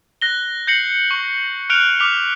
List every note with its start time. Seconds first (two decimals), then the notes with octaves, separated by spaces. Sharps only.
0.22 F#6 A#6 G7
0.67 G6 A#6 C7 C#7 F#7
1.11 C#6
1.70 F6 F#6 C#7 D7 F7
2.00 D6 F6 B6 F7